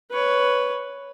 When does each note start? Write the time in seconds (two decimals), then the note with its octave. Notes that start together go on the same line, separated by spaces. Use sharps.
0.11 B4 C#5